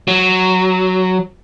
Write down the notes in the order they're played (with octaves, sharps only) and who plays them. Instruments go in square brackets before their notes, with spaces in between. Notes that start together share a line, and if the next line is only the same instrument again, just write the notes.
[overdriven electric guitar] F#3